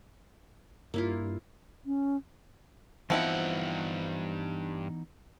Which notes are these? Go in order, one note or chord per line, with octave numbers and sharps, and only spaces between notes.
G2 A#3 E4 F4
C#4
G2 E3 F3 B3 C4 D#4 E4 F#5